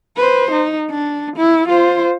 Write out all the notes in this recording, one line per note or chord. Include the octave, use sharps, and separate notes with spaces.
B4 C5
D#4
D4
E4
F4 C5